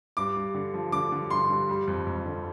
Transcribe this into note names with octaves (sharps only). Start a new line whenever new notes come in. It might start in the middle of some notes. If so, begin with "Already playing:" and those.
G2 D6
G2
D3
F3
D3 D6
D3
G2 C6
G2
G3
F2
F2
D3